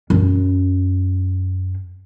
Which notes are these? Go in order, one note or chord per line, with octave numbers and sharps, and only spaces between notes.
F#2 C#4